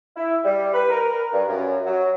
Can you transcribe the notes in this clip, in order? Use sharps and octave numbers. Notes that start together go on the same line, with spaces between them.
E4
G3
B4
A#4
G2
F#2
F#3